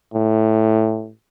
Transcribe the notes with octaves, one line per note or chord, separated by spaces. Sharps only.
A2